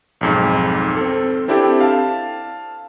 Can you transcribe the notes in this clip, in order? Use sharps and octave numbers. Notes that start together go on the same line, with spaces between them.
B1 F2 G#2
C4 A4
C4 D4 E4 G4 A4 G5
F5 A5